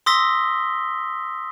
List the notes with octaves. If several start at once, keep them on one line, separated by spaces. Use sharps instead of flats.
C6 D#6 E6 A#6 B6 G7